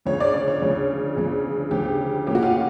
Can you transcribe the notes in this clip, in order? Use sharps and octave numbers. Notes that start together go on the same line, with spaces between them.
D2 C#3 F3 C#5
D5
D5
C#5
D2 C#3 F3
D2 C#3 F3
D2 C#3 F3 G4
A2 F3 A#3 C#4 G4
F#4
F4
F#4